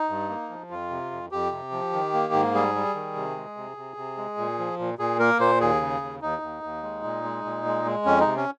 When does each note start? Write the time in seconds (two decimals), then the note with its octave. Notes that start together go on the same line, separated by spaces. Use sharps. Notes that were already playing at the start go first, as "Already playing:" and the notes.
Already playing: D#4
0.09 G2
0.29 A#3
0.49 F3
0.71 F2 F4
0.90 C3
1.11 F2
1.31 F2 G4
1.52 C3
1.72 F3
1.93 D#3
2.14 A#3
2.33 G#2
2.54 G3 G#4
2.75 G3
2.95 D#3
3.16 C3
3.36 G#3
3.57 C3
3.77 C3
3.97 C3
4.17 G#3
4.38 A#2
4.59 F3
4.79 A#2
4.99 A#2 G#4
5.19 A#3 A#4
5.39 A#2 C5
5.60 D#2 G#4
5.81 C#3
6.01 D#2
6.22 D#2 D#4
6.42 D#2
6.63 D#2
6.83 G#3
7.04 A#2
7.24 G#3
7.45 A#2
7.65 G#3
7.85 G#3
8.05 F2 C#4
8.20 D#4
8.26 C3
8.37 C#4